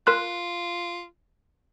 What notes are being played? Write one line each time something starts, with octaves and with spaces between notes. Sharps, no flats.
F4 A#4 C6 F#6